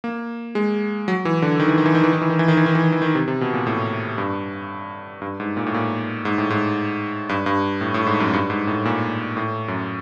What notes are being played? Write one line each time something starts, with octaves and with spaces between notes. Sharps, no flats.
A#3
G#3
F#3
E3
D3
D#3
E3
D#3
E3
D#3
E3
D#3
E3
D#3
E3
D#3
E3
D#3
E3
D#3
E3
D#3
C3
C3
B2
A#2
A2
G2
G2
G#2
A#2
A2
A#2
G#2
A2
G#2
G2
G2
A2
A2
G#2
F#2
G2
G#2
A2
A#2
A2
F#2